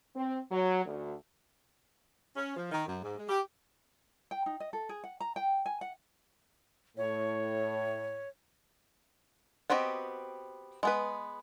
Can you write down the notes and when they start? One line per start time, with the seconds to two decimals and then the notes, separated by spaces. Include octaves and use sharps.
0.15 C4
0.51 F#3
0.85 D2
2.37 C#4
2.57 F3
2.72 D#3
2.87 F#2
3.03 G#2
3.17 G#3
3.29 G4
4.31 G5
4.46 D#4
4.60 D#5
4.73 A4
4.89 G#4
5.04 F#5
5.20 A#5
5.36 G5
5.66 G#5
5.81 F#5
6.97 A2 C#5
9.70 B3 C4 F#4 G4 D#5
10.83 G#3 B3 B4